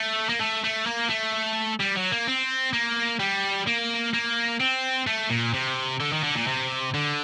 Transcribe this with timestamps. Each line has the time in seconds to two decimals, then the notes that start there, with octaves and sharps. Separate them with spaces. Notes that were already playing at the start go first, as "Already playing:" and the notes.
Already playing: A3
0.29 A#3
0.40 A3
0.64 A3
0.86 A#3
1.09 A3
1.80 G3
1.96 F#3
2.12 A#3
2.27 C4
2.73 A#3
3.19 G3
3.67 A#3
4.14 A#3
4.60 C4
5.07 A3
5.30 A#2
5.53 C3
6.00 D3
6.12 D#3
6.23 D3
6.35 A#2
6.47 C3
6.94 D3